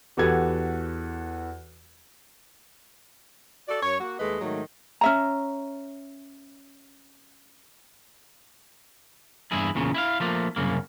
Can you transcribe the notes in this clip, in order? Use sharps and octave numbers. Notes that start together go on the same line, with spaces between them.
E2 F#4 G4 A4 B4 G#6
F#4 A4 D5
F#2 C#5
A#3 F#4
D#2 G#3 A3 B4 D#5
G#2 D#3 F#3 A3
C#4 E5 A#5
E2 G2 E4 G#4
E2 A#2 C#3
E4 E5 F5
F3 A3 A#3
C2 F#2 C#3 A#3